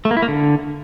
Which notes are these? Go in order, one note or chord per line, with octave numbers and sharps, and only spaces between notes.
A3
A#3
E4
A#3
D3